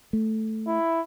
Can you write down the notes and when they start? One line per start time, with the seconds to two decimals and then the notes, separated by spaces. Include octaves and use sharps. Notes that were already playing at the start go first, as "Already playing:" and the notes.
0.13 A3
0.67 E4